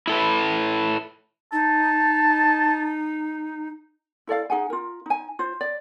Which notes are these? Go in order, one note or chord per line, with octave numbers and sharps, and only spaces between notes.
E4 A4 B4
D#4 A5
E4 A4 D5 F5
D#4 G#4 F#5 G#5
F4 A#4
D#4 G#5
F4 C5
D5